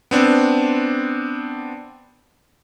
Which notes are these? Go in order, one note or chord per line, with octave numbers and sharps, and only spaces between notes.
B3 C4 D4